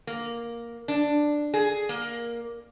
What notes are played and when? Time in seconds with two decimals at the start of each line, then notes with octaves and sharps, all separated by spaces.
0.07 A#3
0.88 D4
1.54 G#4
1.89 A#3